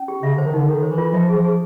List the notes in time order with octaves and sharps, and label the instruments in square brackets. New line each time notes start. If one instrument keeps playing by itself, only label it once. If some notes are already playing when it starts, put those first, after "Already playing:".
Already playing: [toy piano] C#4
G4
[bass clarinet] C#3 [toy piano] E5
[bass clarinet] D3 [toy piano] C5
[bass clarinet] D#3
[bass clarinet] D3 [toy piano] D#4
[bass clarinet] D#3 [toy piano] A4
[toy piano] C5
[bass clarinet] E3
[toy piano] F4
[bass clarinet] F3 [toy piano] E5
[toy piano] G#4
[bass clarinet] F3
[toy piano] G#4